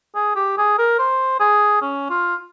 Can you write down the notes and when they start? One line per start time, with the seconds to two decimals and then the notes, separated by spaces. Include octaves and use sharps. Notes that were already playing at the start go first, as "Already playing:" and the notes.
0.15 G#4
0.36 G4
0.58 G#4
0.79 A#4
0.99 C5
1.40 G#4
1.82 C#4
2.10 F4